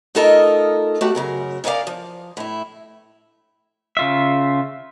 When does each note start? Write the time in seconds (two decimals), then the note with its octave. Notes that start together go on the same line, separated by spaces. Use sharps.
0.15 A3 D#4 F4 A4 A#4 D#5
1.01 A3 F#4 G4 F#5
1.15 F#2 C#3 A#4
1.64 C#4 D#4 A#4 D5 F5
1.87 F3
2.37 A2 E4
3.97 C#3 F4 E5